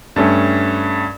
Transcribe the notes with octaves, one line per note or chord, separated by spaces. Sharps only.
G2 A3 C#4